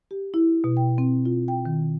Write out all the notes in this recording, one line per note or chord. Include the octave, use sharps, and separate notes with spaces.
G4
E4
B2
G5
C4
F4
G5
D#3